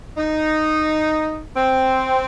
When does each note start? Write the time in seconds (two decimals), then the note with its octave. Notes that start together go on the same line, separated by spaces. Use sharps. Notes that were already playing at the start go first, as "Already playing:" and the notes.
0.17 D#4
1.57 C4